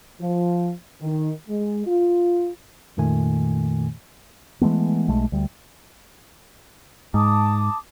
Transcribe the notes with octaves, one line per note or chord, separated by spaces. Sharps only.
F3
D#3
G#3
F4
F2 A#2 D#3 A3 G#5
E3 G#3 A3 B3
B1 G#3 A3
D2 G3
G#2 A5 D6 D#6